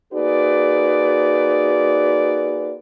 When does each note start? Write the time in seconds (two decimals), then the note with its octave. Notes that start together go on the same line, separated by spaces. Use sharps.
0.14 A#3 D#4 F#4 G#4 B4 D5